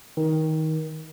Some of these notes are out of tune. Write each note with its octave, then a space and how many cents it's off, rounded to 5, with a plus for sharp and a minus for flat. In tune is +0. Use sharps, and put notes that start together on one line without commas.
D#3 +20